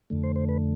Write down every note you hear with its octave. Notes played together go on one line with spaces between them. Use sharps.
F2 D3 A3
C5
C5
B4